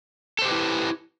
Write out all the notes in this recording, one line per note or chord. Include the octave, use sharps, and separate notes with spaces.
E4 G4 A4 B4 C5